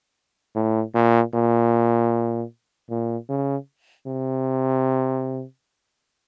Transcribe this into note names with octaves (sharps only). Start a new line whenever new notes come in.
A2
A#2
A#2
A#2
C#3
C3